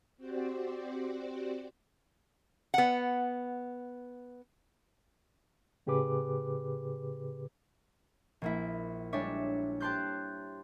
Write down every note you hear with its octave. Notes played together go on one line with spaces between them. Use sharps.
C4 F#4 G4 C5 D5
B3 F#5
A2 C#3 G4 G#4 B4 D6
A#1 A#3 E4
G3 G#3 D4 C#5 E5
G4 C5 A5 C6 F#6 G6